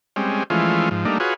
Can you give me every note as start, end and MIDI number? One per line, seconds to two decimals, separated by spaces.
0.16 0.43 55
0.16 0.43 56
0.16 0.43 60
0.16 0.43 61
0.50 0.89 52
0.50 0.89 53
0.50 0.89 56
0.50 0.89 57
0.50 0.89 61
0.50 0.89 65
0.91 1.05 44
0.91 1.05 53
1.05 1.18 55
1.05 1.18 57
1.05 1.18 58
1.05 1.18 62
1.05 1.18 63
1.20 1.34 65
1.20 1.34 66
1.20 1.34 68
1.20 1.34 71
1.20 1.34 73